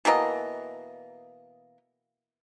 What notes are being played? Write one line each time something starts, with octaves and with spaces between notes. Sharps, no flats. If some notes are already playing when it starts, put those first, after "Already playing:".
B2 E3 A#3 D#5